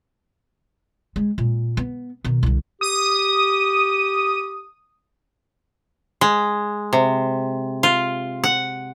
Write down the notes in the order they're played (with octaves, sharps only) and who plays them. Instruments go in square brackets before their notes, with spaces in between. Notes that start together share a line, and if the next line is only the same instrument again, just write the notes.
[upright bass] G#3
A#2
B3
B2 D#3
C2 D3
[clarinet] G4 [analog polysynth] D#6
[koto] G#3
C3
F4
F#5